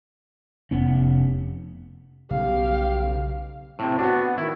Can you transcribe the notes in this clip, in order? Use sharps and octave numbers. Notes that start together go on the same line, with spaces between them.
F1 B3 C#4
B1 C#3 G3 B3 G4 F5
A2 C3 C4
B3 D4 F#4
D#3 E4